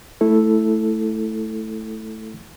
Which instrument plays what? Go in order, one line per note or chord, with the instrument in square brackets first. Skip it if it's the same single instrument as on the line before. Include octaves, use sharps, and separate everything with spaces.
[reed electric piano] A3 E4 A4